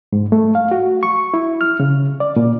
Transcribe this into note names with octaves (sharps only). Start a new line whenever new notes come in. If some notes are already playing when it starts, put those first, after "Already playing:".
G#2
A3
F5
F#4
C#6
E4
F6
C#3
D5
A#2